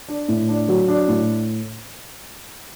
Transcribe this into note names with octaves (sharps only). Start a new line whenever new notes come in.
D4
A2
D4
F#3
D4
A2